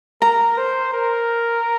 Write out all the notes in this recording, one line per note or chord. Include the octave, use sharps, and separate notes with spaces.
A#4 A#5
C5
A#4